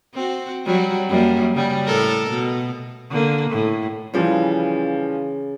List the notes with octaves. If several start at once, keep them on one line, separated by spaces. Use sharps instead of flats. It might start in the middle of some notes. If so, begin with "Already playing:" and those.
C4 F#4
F#3 G3
F#2 G3 A#3
C#3 G3
A2 A4 A#4
B2
D3 A#3
A2
C#3 E3 F3 G3